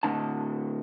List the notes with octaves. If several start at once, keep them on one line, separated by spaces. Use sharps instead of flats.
D2 A2 D3 A5